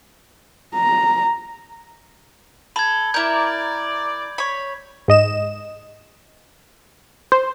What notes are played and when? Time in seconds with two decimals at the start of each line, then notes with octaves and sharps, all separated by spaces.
0.75 A#5
2.76 A4 B5 G#6
3.14 E4 A#4 D5 G6
4.38 C#5 B5
5.08 G#2 D#5 E7
7.32 C5